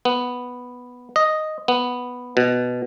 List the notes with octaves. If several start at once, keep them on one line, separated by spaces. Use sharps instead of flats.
B3
D#5
B3
B2